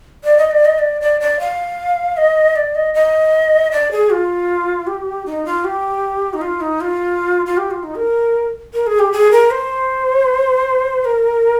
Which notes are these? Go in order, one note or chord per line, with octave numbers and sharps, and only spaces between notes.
D5
D#5
D5
D#5
D5
D5
D5
F5
D#5
D5
D#5
D#5
D5
G#4
F4
G4
D#4
F4
G4
D#4
F4
D#4
F4
F4
G4
F4
D#4
A#4
A#4
G#4
G4
G#4
A#4
C5
A#4